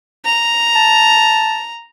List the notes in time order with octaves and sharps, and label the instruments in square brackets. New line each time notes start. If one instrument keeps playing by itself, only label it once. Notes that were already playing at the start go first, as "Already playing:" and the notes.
[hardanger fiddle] A#5
[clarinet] A5